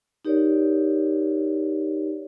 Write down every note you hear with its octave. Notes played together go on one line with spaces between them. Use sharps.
D#4 G4 A#4 C#5 D5